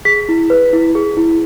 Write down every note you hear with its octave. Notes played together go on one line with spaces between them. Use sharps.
G#4 B6
E4
B4
E4
G#4
E4